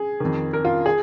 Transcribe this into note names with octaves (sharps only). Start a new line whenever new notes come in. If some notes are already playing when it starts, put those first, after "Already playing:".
Already playing: G#4
F2 D#3
A#4
F4
G#4